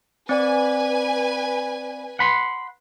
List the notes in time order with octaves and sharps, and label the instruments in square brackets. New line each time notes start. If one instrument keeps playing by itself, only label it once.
[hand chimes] C4 D5 [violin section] B4 G#5
[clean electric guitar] F#5 B5 C6